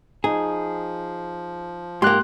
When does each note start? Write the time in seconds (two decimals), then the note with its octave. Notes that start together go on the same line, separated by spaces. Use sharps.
0.24 F3 D#4 G#4
2.02 G#2 A#3 G4 C6 F#6